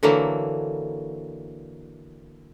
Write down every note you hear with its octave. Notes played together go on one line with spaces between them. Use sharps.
D3 E3 F#3 A#3